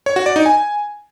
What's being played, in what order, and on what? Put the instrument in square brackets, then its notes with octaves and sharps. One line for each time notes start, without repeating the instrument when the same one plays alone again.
[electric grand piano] C#5
F#4
D5
D#4
G#5